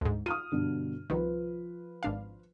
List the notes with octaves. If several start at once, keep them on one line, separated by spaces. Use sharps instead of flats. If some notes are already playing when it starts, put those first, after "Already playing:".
D2 G#2
F4 D#6 F6 D#7
G2 B2 D3
C2 D#3 F3 F4 B4
G#1 D4 F5